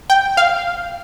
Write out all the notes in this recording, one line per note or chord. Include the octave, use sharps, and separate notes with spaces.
G5
F5